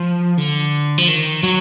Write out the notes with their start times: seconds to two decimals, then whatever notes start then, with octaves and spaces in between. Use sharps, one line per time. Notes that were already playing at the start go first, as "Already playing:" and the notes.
Already playing: F3
0.38 D3
0.98 F3
1.08 D#3
1.43 F#3